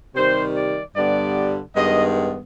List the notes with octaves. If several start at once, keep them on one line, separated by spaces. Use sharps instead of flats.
C3 D#3 G3 C5
D5
G2 D3 G3 B3 D5
G2 D#3 G#3 B3 D#5